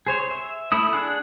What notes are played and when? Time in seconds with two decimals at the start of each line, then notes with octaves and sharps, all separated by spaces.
0.07 G#4 C5 C#5
0.31 E5
0.72 A3 E4 D#6
0.93 D4 G#4 F#5